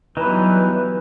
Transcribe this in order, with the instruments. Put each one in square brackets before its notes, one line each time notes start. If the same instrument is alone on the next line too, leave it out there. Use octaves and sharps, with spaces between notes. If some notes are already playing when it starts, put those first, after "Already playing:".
[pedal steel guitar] E3 D#4 [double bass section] F#3 G3 B3 [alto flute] B4